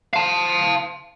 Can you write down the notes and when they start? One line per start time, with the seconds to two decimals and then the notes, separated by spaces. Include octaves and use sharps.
0.13 F5 A5